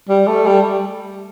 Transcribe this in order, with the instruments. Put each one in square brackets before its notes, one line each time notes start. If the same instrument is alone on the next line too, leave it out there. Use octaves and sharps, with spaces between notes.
[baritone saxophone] G3
A3
G3